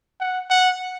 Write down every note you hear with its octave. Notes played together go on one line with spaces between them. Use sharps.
F#5
F#5